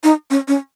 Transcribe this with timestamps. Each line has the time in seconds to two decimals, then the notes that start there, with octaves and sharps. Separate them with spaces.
0.04 D#4
0.30 C#4
0.48 C#4